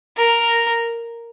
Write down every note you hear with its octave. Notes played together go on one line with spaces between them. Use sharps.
A#4